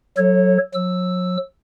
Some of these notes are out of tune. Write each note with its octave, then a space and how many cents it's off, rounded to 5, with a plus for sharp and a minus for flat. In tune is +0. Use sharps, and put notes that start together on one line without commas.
F#3 +0 A4 +0 C#5 -25
F#3 -35 E6 +0